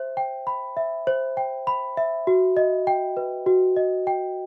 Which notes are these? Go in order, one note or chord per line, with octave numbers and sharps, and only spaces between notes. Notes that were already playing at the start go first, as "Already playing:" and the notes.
Already playing: C5 E5
G5
B5
E5
C5
G5
B5
E5
F#4
D#5
G5
B4
F#4
D#5
G5